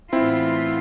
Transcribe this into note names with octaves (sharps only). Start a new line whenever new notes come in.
A2 E3 B3 C4 E4 F4